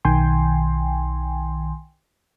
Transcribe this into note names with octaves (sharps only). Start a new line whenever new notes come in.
B1 D#3 G5 G#5 C6